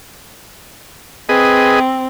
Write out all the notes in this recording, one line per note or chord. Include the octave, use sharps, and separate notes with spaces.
C4 G#4 B4 D#5